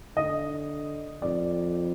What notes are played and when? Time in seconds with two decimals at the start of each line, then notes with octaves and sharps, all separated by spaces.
0.17 D3 D#5
1.22 F2 D5